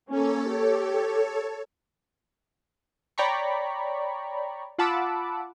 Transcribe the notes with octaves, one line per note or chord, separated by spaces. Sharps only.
A#3 C#4 A4 C#5
G4
C#5 D5 G5 A#5 B5 C#6
F4 F#5 A5 B5 D6 E6